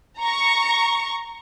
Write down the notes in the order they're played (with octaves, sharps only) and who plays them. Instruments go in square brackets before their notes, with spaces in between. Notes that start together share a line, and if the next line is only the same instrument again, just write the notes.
[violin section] A#5 C#6